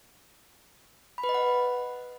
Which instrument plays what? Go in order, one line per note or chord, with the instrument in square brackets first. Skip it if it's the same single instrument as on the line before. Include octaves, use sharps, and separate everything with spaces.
[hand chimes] B5
B4
D#5
F#5